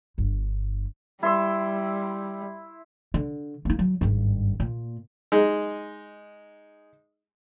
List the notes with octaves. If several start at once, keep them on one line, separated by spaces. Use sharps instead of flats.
G1 G2
G3 E4 C6 E6
D3
A#3 D#4
F#3
G#1 G2
A#2
G#3 D#4